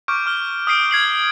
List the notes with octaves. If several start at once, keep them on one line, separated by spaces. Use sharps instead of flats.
C#6 D6 F6 G6 D7
C#6 F6 G7
D#6 F6 G6 C7 D7 G7
F6 G#6 C7 F#7